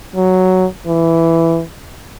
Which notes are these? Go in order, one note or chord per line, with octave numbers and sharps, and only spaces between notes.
F#3
E3